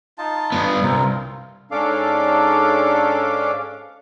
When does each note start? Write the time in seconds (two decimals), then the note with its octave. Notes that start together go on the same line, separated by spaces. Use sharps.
0.18 D#4 F4 A5
0.52 G2 B3
0.83 C2 C4 F4 A#4
1.71 G#2 C#4 D4 A4 F5 D6